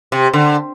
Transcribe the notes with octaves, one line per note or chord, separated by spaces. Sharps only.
C3
D3